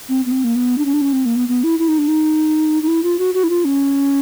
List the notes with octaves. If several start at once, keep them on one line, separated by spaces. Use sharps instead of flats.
C4
B3
C4
A#3
B3
D4
C#4
D4
C#4
C4
A#3
B3
B3
E4
E4
D#4
D4
D#4
D#4
E4
F4
F#4
F#4
E4
F4
C#4